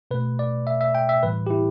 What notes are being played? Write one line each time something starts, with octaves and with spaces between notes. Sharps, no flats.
B2 A3 B4
D5
E5
E5
G5
E5
A2 E3 G3 B4
G4
E4